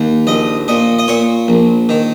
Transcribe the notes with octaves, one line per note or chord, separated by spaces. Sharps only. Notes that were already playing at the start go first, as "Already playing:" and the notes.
Already playing: D#2
A#1 D#5
A#2 D#5
D#5
A#2 C#5
A#1
D#3